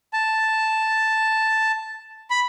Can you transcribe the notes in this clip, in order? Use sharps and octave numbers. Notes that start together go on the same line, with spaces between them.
A5
B5